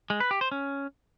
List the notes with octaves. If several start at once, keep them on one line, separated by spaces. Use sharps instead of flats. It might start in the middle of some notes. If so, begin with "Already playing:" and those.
G#3
B4
G4
C5
C#4